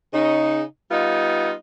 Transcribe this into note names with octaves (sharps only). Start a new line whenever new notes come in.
C#3 D#4
G3 B3 D#4 F4